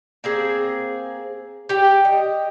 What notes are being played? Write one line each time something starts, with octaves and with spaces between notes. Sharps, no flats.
A#3 C4 G#4
G4 G5
D#5